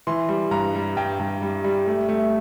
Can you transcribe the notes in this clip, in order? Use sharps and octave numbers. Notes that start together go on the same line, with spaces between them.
E3 C6
G3
G2 A#5
G3
G2 G5
G2
G3
G3
A3
A3